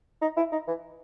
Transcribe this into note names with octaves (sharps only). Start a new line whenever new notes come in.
D#4
E4
D#4
E3